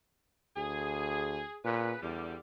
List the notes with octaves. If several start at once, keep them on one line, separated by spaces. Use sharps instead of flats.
D2 G#4
A#2 C#3 B3 B4
E2 D3 G3